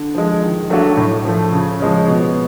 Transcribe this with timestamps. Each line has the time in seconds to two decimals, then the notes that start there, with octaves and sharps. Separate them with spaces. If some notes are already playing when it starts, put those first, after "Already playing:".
Already playing: D3
0.15 F3 G#3
0.43 D#3
0.70 F#3 A3 D4 F#4
0.97 A2
1.25 F3 A3
1.52 C#3
1.80 F3 G#3 C#4
2.08 B2